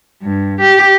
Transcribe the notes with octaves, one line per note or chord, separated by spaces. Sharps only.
G2
G4